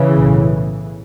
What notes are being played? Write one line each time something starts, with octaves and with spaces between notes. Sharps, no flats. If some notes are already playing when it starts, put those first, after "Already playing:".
Already playing: C#3 E3
B1 A2